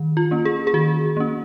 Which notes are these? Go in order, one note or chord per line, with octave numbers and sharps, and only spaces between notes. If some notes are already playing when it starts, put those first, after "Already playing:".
Already playing: D#3
F4
A#3 C#4
G#4
G#4
D#3 F#4
A#3 C#4